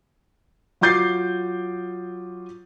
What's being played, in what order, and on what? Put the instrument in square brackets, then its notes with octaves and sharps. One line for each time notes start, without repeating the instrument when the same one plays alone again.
[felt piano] F#3 F4 D6 G6 A6 C7